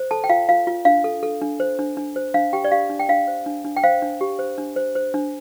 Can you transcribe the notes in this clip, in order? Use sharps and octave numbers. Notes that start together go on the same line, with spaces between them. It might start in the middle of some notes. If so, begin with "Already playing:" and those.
Already playing: C5
A4 A5
G5
F4 F5
F4 F5
F4
D4 F5
A4
A4
D4
C5
D4
D4
C5
D4 F5
G4 G5
D5
G4 F5
D4
G5
D4 F5
C5
D4
D4
G5
C5 F5
D4
G4
C5
D4
C5
C5
D4